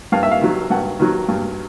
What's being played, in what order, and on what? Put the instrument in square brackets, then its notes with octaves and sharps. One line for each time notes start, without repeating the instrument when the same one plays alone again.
[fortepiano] G2 F5
E5
F5
D#3 F#3
G2 F#5
D#3 F#3
G2